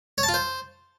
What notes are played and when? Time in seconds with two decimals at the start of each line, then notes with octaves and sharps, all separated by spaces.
0.18 C#5
0.23 A5
0.29 F4
0.34 C5